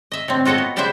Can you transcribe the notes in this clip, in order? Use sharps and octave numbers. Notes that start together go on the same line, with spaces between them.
D#5 E5
A2 D3 C4
F4 F#4 A4 C#5 D#5
B3
C#3 G3 E4 B4 C5 E5